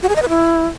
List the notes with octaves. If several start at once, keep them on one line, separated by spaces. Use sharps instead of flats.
F#4
G#4
D#5
B4
E4